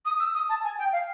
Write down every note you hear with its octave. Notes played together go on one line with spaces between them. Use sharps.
D#6
E6
D#6
A5
G#5
G5
F5